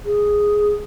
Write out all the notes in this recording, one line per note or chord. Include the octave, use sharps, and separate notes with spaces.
G#4